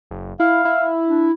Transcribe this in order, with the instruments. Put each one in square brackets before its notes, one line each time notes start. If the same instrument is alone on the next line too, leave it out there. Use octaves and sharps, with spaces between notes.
[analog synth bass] F#1
[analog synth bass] E4 [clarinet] F5
[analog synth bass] E4
[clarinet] D4